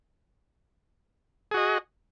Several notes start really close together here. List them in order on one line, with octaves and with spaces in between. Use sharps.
G#4 F#4 D#5